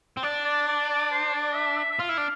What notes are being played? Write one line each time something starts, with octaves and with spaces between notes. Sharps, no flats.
C4
D4 D5
D5
D5
D5
C5
D5
E5
E5
E5
F4 F5
E4
D4